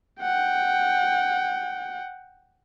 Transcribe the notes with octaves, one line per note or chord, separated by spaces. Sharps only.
F#5 G5